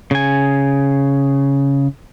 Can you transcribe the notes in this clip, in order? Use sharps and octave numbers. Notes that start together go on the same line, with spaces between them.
C#3 G#5